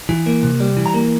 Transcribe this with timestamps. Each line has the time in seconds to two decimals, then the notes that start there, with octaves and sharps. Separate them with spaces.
0.09 E3
0.26 A#3
0.43 C3
0.60 G3
0.77 E3
0.86 A#5
0.94 A#3